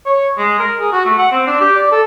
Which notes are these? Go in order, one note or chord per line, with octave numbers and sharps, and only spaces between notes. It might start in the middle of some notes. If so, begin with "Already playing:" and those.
C#5
G#3
A#4
G#4
F#4
A3
F#5
C4
D4
G4
D5
A4